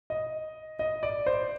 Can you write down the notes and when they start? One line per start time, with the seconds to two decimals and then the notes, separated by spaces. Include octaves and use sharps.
0.10 D#5
0.79 D#5
1.03 D5
1.26 C5